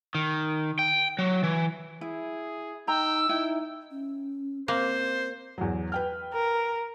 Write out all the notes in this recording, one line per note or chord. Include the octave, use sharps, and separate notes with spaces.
D#3
G5
F#3
E3
E4 G#4
D#4 G5 A#5 E6
D#4 E4 G5
C#4
A#3 C4 C5
E2 F#3
B4 G5 F6
A#4